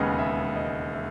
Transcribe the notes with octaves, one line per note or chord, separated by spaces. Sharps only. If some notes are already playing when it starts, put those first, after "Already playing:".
Already playing: E1 D#2 C#3 G#3 B3 D#5
E5
D#5
E5